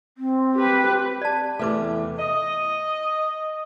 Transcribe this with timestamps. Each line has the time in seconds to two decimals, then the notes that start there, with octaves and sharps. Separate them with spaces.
0.18 C4
0.56 G4 B4
1.22 D5 A5
1.59 E2 C3 A3 A4 B4 D6
2.19 D#5